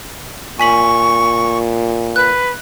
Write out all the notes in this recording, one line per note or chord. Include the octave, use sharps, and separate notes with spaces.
A#2 G#5 C#6 B6 F#7
B4 F#6